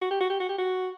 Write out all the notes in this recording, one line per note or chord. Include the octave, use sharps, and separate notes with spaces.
F#4
G4
F#4
G4
F#4
G4
F#4